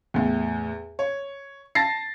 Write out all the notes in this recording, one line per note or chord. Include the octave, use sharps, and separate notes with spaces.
E2 A2
C#5
A5 A6 A#6 C7